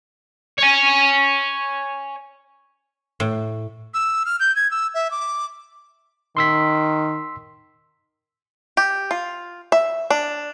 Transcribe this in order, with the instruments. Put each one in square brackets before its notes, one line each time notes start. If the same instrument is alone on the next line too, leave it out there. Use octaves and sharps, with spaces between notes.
[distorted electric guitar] C#5 G#5
[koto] A2
[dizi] E6
F6
G6
G#6
E6
E5
D6
[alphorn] D#3 [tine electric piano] C6 E6 B6
[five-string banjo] G4
F4
E5
D4